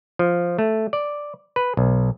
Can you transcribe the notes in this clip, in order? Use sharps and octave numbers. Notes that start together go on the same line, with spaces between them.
F3
A3
D5
B4
B1